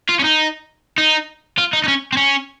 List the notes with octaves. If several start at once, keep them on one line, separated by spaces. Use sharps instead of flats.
F4
C#4
D#4
D#4
F4
D#4
D#4
C#4
C4
C#4